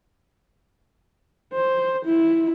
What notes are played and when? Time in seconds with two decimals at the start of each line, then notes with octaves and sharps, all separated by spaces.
1.53 C5
2.06 E4